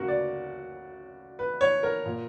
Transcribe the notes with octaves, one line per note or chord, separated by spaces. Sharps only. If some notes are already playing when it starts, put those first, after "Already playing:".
Already playing: D2 C#3 F#4 A#4
D5
B4
C#5
A#4
A#2